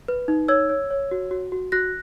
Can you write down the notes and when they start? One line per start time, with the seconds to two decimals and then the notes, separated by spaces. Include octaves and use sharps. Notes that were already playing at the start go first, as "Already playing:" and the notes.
0.08 B4
0.28 D#4
0.48 C#5 E6 G#6
0.69 C#5
0.91 C#5
1.11 F#4
1.31 F#4
1.52 F#4
1.72 F#4 F#6 A#6